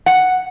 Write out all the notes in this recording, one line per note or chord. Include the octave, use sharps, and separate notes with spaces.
F#5